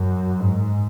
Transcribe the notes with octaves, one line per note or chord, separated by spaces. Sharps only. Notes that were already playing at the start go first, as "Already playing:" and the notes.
Already playing: F#2
G#2